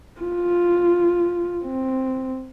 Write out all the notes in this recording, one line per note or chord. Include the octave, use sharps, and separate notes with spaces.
F4
C4